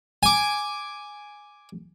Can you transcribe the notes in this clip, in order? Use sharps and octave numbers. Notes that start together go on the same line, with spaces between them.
G#5 D6